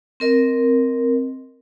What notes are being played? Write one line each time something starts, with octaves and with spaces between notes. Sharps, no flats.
C4 A#4 D#5